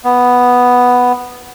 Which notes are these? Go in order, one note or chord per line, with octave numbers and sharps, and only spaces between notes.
B3